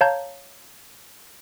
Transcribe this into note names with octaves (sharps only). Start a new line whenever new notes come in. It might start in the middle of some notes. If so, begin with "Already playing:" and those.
C#5 F5 A5 A#5 G6 G#6